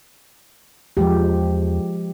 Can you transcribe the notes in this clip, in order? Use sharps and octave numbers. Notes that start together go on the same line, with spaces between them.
E2 F3 G#3 G4